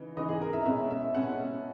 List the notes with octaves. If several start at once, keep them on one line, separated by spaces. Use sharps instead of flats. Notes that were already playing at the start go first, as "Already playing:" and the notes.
Already playing: C#3 E3 D#4
C#3 E3 B3 D#4 D#5
G#4
A#4
E5
B2 G#3 C#4 E5
E5
B2 G#3 C#4 F#5